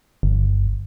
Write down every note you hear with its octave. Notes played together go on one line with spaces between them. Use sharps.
G1